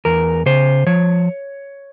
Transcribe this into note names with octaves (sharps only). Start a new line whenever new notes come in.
E2 A#4
C#3 C5
F3 C#5